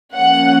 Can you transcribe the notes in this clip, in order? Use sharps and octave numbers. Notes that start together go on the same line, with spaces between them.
F3 A#3 C#4 F#5